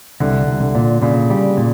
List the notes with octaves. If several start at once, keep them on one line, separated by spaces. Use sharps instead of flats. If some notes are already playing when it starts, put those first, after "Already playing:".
C2 D3
C2
D3
A#2
A#2 C#3
G3
A#2